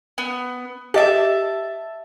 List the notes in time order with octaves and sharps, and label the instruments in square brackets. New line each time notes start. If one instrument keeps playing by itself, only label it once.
[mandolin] B3
[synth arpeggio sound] G4 D#5 [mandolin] E5 A5